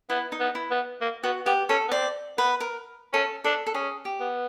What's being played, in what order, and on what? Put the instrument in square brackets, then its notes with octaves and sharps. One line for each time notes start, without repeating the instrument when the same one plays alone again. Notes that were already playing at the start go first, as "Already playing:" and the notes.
[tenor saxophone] B3 [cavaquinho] E4
[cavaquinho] D#4
[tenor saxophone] B3
[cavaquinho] E4
[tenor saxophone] B3
A#3
[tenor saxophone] B3 [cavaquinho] F#4
[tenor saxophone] B3 [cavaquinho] G4
[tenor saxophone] C#4 [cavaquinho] A4
[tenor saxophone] B3
[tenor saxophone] C4 [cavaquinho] D5
[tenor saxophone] B3 [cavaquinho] B4
[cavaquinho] A#4
[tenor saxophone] C#4 [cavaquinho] A4
[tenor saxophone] D4 [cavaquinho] A4
[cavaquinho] A4
[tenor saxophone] C#4 [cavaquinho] G#4
[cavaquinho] G4
[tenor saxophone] B3